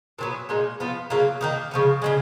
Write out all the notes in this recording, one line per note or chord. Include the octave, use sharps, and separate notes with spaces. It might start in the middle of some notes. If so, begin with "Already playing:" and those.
A#2 F#3 B3
A#2 G#3 D#4
F3 B3 F4
C#3 F#3 A#3 F4
D#3 A#3 D#4
C#3 F3 B3
C#3 F3 G#3